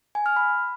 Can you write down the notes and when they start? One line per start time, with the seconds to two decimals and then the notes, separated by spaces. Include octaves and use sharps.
0.15 G#5
0.26 F6
0.36 B5